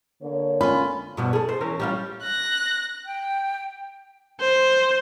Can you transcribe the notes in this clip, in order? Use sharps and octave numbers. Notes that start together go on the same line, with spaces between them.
D3 A#3 C#5
C#4 F4 B5
G2 B2 F3
G#4 A4
C5
E3 C#4 A#4
G3 C#4 F4
F#6 A#6
G5
C5